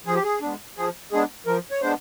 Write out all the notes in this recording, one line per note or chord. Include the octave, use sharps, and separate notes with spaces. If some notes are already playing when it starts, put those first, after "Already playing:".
F3 G#4
G4
G#4
G#3 B3 D4
F3 G#4
G#3 B3 D4 G#4
F3 A#4
C#5
G#3 B3 D4 C5